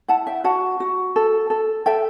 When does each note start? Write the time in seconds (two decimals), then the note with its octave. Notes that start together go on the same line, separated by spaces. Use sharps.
0.08 E4 F#5 A5
0.27 E5 G5
0.44 F#4 F#5 A5
0.80 F#4
1.16 A4
1.50 A4
1.86 A4 E5 G5